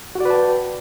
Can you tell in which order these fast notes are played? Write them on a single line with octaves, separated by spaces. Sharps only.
F#4 D5 B4 A5 G5